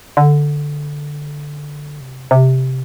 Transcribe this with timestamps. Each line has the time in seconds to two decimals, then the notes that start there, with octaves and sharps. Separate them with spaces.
0.17 D3
2.01 C3
2.31 C3